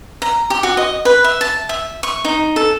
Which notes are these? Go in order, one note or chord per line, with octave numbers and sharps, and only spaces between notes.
A#5
G4
F#4
D#5
B4
E5
A5
E5
C#6
D#4
A4